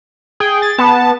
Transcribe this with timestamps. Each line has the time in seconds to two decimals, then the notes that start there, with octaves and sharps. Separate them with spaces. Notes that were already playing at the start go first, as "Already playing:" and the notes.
0.40 G#4 G5
0.62 A6
0.78 B3 A5